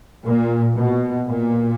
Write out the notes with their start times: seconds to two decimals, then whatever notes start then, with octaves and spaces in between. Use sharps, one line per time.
0.23 A#2
0.75 B2
1.27 A#2